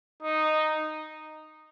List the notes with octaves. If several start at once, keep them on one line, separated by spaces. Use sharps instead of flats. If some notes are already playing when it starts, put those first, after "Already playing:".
D#4